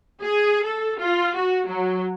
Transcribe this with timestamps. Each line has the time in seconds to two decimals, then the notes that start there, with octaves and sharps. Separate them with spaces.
0.20 G#4
0.64 A4
0.99 F4
1.34 F#4
1.66 F#3